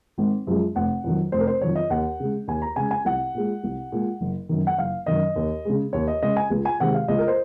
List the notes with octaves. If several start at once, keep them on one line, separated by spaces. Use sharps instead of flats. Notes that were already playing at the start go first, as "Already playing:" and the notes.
G#1
F#2 F3 G#3
F1 F#5
F2 D#3 F#3
F1 C5
A#4
C5
F2 D#3 F#3 C#5
D#5
D#2 F#5
C#3 G#3
D#2 G#5
A#5
C#3 G#3 G#5
G#5
C2 F#5
A#2 G#3
C2
A#2 G#3
F#1
F#2 D#3
F#5
F#1 F5
F#2 D#3 D#5
D#2
C#3 G#3
D#2 C#5
D#5
C#3 G#3 D#5
G#5
C#2
G#5
C3 D#3 G#3 F#5
F5
C#2 D#5
A#4
C5